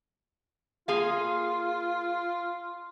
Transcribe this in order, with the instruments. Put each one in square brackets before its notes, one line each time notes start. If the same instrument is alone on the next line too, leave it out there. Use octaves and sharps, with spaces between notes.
[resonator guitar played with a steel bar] A#3 G#4 F5 [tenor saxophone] F4